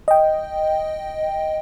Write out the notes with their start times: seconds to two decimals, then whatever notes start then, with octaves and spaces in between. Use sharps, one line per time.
0.08 D#5 G5